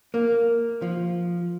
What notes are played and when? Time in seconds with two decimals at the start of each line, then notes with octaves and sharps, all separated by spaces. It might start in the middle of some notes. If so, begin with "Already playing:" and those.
0.14 A#3
0.82 F3